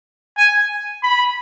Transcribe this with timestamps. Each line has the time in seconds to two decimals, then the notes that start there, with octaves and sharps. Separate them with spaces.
0.37 G#5
1.03 B5